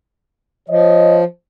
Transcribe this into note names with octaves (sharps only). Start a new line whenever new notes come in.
F3 C#5 D#5